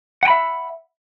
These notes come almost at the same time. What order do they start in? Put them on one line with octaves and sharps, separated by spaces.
F#5 G5 B5 E5